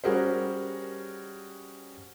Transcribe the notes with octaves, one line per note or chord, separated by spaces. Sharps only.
G3 C#4 F#4 G#4 A#4 C5